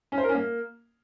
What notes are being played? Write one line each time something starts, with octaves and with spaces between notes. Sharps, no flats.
C#4
C5
A#4
C#4
A#3